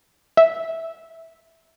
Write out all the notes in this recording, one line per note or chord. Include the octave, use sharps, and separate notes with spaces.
E5